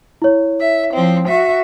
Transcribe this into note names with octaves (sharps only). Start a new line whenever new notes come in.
E4 C#5
E5
F3 C4
F#4 E5